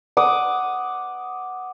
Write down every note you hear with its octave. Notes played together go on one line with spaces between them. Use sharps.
F#5 D6 D#6